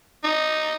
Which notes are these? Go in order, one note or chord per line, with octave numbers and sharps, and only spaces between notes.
D#4